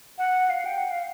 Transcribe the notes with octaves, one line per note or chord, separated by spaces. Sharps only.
F#5
F5
G5
F#5
F5